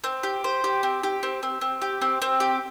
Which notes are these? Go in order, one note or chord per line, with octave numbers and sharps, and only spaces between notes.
C4
G4
C5
G4
C4
G4
C4
C4
C4
G4
C4
C4
G4